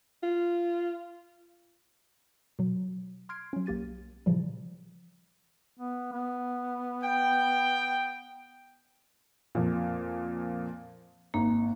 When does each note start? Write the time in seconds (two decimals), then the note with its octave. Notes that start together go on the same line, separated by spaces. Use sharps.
0.23 F4
2.59 B2 F#3
3.29 C6 F6 G#6 C7 D7
3.53 F#3 C#4
3.66 B1 A#3 G4 A6 D#7
4.26 A#2 C#3 E3 F3 G3
5.79 B3
6.12 B3
7.02 G5
9.55 F2 A#2
11.34 G#1 A#3